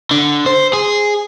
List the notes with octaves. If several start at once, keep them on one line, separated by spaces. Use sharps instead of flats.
D3
C5
G#4